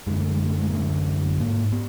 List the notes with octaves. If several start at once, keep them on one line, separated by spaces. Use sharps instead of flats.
F#2 D3 G#3
A3
G#3
A3
G#3
A#3
F#2 D3 A3
G#2 A#3
B3